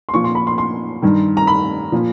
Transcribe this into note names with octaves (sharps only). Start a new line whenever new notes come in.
C6
A#2 F3 C#6
C6
B5
C6
C6
G2 D#3
A#5
B5
A#2 F3